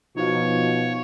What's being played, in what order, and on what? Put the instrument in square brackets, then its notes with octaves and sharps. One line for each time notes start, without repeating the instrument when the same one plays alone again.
[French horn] B2 [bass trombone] F3 [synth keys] D#4 F#4 F5 [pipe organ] C#5